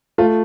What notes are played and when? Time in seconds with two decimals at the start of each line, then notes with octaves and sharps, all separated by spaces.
0.18 A3 F4